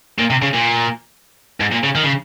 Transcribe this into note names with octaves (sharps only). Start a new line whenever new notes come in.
A#2
C3
C#3
A#2
G#2
A#2
C#3
D#3
C#3